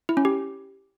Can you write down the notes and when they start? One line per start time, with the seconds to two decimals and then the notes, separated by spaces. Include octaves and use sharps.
0.09 E4
0.17 C#4
0.25 G4